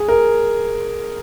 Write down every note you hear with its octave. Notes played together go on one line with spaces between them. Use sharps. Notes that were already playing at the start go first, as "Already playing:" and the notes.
Already playing: G#4
A#4